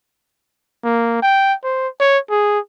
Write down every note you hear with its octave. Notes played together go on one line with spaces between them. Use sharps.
A#3
G5
C5
C#5
G#4